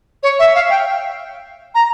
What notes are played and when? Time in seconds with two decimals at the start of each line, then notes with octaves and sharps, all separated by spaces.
0.23 C#5
0.39 E5
0.55 F5
0.70 G5
1.75 A#5